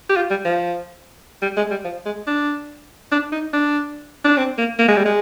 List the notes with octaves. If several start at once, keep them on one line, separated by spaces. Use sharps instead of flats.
G4
F4
G3
F3
G3
G#3
G3
F3
G#3
D4
D4
D#4
D4
D4
C4
A#3
A#3
G#3
G3
G#3